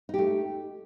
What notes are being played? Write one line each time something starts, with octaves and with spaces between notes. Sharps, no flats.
A3 D#4 G4